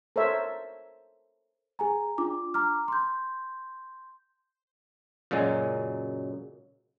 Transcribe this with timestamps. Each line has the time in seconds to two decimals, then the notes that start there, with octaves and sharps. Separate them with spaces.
0.16 A4 A#4 C5 C#5 E5
1.79 G#4 G#5 A#5
2.18 D4 F4 D6
2.54 A#5 D6 F6
2.88 C6 G6
5.31 F#2 A#2 C#3 F#3 G#3